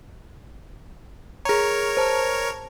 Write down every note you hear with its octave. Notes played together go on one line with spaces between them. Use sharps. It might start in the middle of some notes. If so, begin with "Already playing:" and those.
G#4 A#4 C#5 A#5
C5 A5